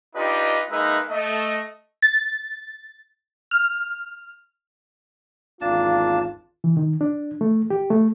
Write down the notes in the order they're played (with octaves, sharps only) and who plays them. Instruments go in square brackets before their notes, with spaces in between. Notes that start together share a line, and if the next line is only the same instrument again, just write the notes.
[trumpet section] D4 D#4 F4 G4 B4 D#5
G#3 A#3 D#4 A#4 B4 E5
A3 D#5
[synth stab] A6
F6
[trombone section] G#1 E2 F4 [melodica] A#3 D4 A5
[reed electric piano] E3
D#3
D4
A3
G4
A3